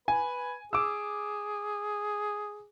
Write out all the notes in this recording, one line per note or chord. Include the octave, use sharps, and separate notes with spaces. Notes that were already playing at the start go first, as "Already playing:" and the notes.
B4 G#5
G#4 D6 E6